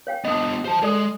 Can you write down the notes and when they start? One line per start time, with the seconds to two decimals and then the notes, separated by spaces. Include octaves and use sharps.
0.07 C#5 F5 G5
0.25 B3 D4 D#5 D#6
0.65 C5 A5
0.82 G#3 A4 D5 D#6